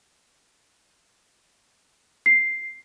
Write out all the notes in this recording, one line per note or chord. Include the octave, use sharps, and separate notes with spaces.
C7